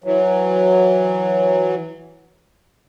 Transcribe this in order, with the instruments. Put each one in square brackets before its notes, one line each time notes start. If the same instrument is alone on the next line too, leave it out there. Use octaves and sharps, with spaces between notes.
[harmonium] E3 F#3